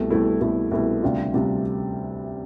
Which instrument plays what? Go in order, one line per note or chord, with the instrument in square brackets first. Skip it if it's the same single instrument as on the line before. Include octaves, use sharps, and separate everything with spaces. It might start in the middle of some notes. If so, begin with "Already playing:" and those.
Already playing: [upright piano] C2 B2 A3 E4
C2 B2 A3 E4
C2 B2 A3 E4
C2 B2 A3 E4
D2 C3 G3 D4 F4
D2 C3 G3 D4 F4